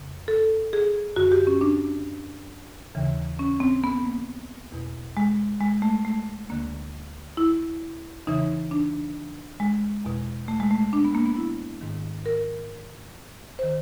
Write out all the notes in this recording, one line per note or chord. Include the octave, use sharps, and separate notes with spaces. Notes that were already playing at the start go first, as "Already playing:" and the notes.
Already playing: F2 C#3
A4
G#4
F#2 D3 F#4
G4
C#4
D4
D#2 C#3 E3
C#4
C4
B3
A#3
E2 B2
G#3
G#3
A3
A3
D2 D3 A#3
E4
E2 C#3 E3 D#4
D4
G#3
E2 B2
A3
G#3
A3
D4
B3
A#3
B3
E4
G#2 D#3
A#4
D#3 C5